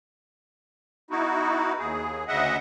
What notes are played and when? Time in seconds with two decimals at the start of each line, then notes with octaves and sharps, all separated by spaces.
1.11 B3 D#4 E4 F#4
1.79 D#2 G#4
2.28 D2 C#3 D#5 E5 F#5